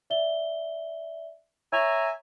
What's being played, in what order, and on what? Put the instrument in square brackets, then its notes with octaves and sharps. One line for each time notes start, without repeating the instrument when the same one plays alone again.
[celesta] D5 E5 G7
[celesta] C#5 C#6 F7 [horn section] E5 G#5 A#5